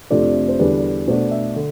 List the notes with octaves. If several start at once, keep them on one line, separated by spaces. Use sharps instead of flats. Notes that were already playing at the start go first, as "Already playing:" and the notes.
F2 C3 F3 A3 D4 D5
C5
E2 D3 G3 D4 B4
B2 A3 D4 C5
E5
D3